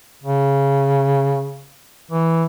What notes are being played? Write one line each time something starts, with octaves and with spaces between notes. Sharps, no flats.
C#3
E3